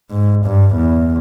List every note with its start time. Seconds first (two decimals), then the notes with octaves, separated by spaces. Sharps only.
0.11 G#2
0.46 G2
0.76 E2